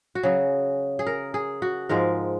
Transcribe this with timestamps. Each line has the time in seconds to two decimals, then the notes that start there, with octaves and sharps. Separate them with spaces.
0.15 F#4
0.23 C#3 F#3 G#4
0.99 G#4
1.07 A#4
1.34 G#4
1.62 F#4
1.89 G#2 F3 G#3 A#4